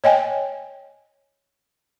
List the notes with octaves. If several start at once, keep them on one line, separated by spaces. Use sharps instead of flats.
C#5 D#5 G5 G#5